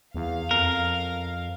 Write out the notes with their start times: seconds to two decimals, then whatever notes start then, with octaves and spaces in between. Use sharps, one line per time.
0.15 E2 F5
0.51 F2 A#4